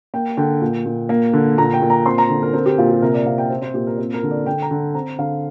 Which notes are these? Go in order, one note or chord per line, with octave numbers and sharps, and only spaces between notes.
A#3 G5
D3 G5
A#2
A#2
A#3
D3
A#2 A#5
G5
A#2
A#5
C4 C6
A#5
D3
A#4
C4 A#4
G4
A#2 F4
G4
C3 A#4
D5
C3 F5
G5
C4
C5
A#2 G4
A#4
C4 C5
A#4
D3
D5
D3 G5
A#5
D3
C4 A#5
D3 F5